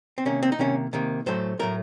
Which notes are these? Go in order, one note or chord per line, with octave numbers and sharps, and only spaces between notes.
C4
C3 D#3 A#3 C#4
C4
D#4
C3 D#3 A#3 C#4
C3 D#3 A#3
A2 F#3 A3 C5
A2 F#3 A3 A#4